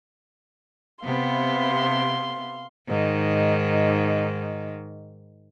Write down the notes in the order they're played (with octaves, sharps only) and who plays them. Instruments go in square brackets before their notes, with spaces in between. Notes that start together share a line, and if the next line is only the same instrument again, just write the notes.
[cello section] C3 B3 [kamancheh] F5 C6
[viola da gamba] G#2 D#3